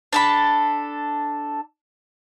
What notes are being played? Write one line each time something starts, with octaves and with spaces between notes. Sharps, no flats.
D4 A4 B5